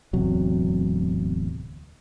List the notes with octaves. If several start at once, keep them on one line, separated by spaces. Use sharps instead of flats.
D1 E2 C3 F#3